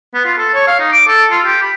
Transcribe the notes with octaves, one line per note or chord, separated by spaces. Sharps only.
B3
F4
A4
C#5
F5
D#4
D6
A4
F4
G4
B5